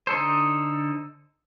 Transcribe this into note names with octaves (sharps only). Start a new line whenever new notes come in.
D3 D#4 A4 C5